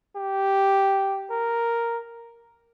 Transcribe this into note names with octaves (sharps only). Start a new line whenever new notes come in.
G4
A#4